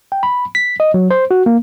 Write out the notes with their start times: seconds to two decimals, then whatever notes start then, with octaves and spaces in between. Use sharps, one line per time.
0.12 G5
0.23 B5
0.55 B6
0.80 D#5
0.94 F#3
1.11 C5
1.31 F#4
1.46 A#3